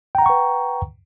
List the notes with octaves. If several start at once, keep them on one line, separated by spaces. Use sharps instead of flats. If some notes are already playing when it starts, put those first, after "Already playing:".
B4 F#5 G5 A#5 C#6